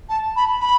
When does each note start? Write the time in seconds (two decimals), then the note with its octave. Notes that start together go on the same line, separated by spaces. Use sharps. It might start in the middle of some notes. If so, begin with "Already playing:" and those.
0.09 A5
0.36 B5
0.61 B5